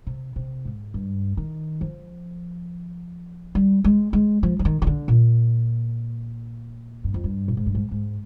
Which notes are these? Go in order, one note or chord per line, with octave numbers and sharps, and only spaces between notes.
C3
C3
G#2
G2
D#3
F3
G3
G#3
G#3
F3
F3
D#3
D#3
D3
A#2
G2
F2
G2
A#2
G#2
G2
G#2
G#2